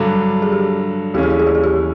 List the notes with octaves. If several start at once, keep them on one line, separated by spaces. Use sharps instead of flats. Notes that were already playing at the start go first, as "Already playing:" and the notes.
Already playing: G2 D3 F#3
G#4
G4
D#2 C#3 E3 A3 C#4 G4
G#4
G4
G#4
G4
G#4
G4